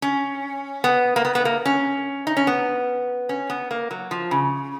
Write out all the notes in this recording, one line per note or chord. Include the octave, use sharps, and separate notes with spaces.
C#4
B3
A#3
B3
B3
A#3
C#4
D#4
C#4
B3
C#4
B3
A#3
F#3
F3
C#3